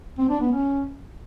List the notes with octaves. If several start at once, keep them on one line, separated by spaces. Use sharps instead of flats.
C4
D4
B3
C#4